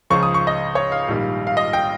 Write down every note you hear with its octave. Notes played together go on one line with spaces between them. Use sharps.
C#2 C#3 F3 C#6
D#6
C#6
D#5
C#5
F5
A#1 G#2 D#3 G3
F5
D#5
G5